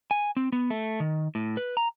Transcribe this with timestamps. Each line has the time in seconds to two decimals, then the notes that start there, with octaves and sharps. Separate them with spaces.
0.11 G#5
0.37 C4
0.52 B3
0.70 A3
1.00 D#3
1.35 A2
1.57 B4
1.77 A#5